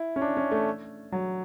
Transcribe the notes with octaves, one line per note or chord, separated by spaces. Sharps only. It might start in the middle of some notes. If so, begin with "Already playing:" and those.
Already playing: E4
C#4
D4
C#4
A3
F#3